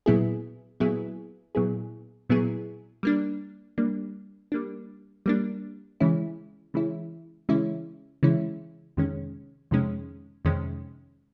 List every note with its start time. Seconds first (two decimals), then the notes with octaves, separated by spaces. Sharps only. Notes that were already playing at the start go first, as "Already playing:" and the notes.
0.06 A#2 F#3 B3 E4 G#4
0.80 A#2 F#3 B3 E4 G#4
1.55 A#2 F#3 B3 E4 G#4
2.30 A#2 F#3 B3 E4 G#4
3.03 G3 A#3 D4
3.78 G3 A#3 D4
4.52 G3 A#3 D4
5.26 G3 A#3 D4
6.00 C#3 E3 G#3 C#4 E4
6.74 C#3 E3 G#3 C#4 E4
7.49 C#3 E3 G#3 C#4 E4
8.23 C#3 E3 G#3 C#4 E4
8.97 F2 C3 D#3 G#3 C#4
9.71 F2 C3 D#3 G#3 C#4
10.45 F2 C3 D#3 G#3 C#4